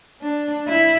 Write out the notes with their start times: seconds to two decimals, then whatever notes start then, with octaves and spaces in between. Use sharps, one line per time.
0.22 D4
0.68 E4